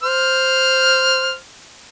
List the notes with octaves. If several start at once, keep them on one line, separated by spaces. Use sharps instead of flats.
C5 F6